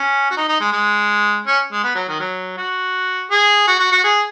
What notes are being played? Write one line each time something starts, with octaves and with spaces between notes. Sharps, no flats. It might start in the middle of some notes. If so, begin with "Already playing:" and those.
Already playing: C#4
F#4
D#4
D#4
G#3
G#3
C#4
G#3
B3
F#3
D#3
F#3
F#4
G#4
F#4
F#4
F#4
G#4